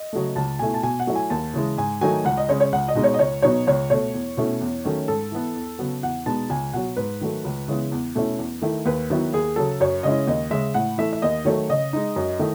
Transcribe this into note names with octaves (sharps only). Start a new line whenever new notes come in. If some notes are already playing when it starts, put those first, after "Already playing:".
Already playing: D#5
C#3 F#3 A3
C#2 A5
B2 A3 E4 G#5
A5
B2 G#5
F#5
F#3 A3 E4
G#5
D#2 A5
C#3 E3 G#3
G#2 G#5
D#3 F#3 A3 D#4 G#5
C#2 F#5
D#5
C#3 G#3 C#4 C#5
C#5
C#2 F#5
D#5
B2 G#3 D#4
C#5
D#5
C#2 C#5
B2 F#3 B3 D#4 C#5
C#2 C#5
B2 A3 C#5
E2
B2 A3 C#4 E4
E2
D#3 F#3 A3 C#4
G#2 A4
E3 B3
E2
C#3 F#3 B3
E2 F#5
B2 G#3 B3 D#4 A5
C#2 G#5
B2 F#3 F#5
G#2 B4
D#3 F#3 A3
C#2
C#3 E3 G#3 B3
E2
B2 A3 C#4 E4
E2
D#3 A3 E4
D#2 B4
D#3 F#3 B3 E4
D#2 G#4
C#3 F#3 A4
F#2 C#5
C#3 G#3 C#4 E4 D#5
D#2 D#5
C#3 G#3 E5
A2 F#5
E3 A3 E5
E5
D#2 D#5
D#3 F#3 A3 C#5
C#3 D#5
G#3 D#4
F#2
D#3 A3 E4